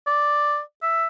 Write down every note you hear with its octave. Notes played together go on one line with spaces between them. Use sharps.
D5
E5